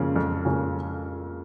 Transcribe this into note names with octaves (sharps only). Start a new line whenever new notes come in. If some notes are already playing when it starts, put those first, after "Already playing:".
Already playing: F2 C#3 F3 A#3 C#4
F2
C#3 F3 A#3 C#4